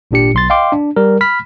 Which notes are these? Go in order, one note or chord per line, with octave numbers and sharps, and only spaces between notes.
G#1 A#2 D4 G4 C#7
B1 C6 A6
D#5 F5 G5 C6 D6
D4
G3 A#4
B5 F6 B6